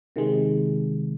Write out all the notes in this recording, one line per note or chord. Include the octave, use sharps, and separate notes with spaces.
C3 D#3 G#3